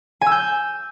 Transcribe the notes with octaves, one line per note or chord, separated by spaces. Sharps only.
G#5
E6
G6